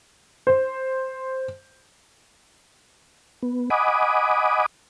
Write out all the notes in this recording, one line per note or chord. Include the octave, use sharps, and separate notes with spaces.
C5
B3
D#5 F#5 G#5 B5 D6 D#6